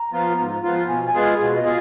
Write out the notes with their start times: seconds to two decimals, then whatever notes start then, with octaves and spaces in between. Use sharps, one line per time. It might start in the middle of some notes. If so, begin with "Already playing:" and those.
Already playing: A#5
0.12 F3 B3 F4
0.38 G#2
0.63 F3 B3 F4
0.88 B2 G#5
1.06 G#5
1.13 G#3 B3 F4 G#4
1.40 B2 B4
1.56 D#5
1.65 F4 G#4